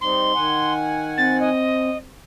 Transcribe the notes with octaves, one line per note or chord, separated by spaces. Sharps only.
G3 C4 D#4 C6
D#3 F#5 G#5
C4 A6
D#5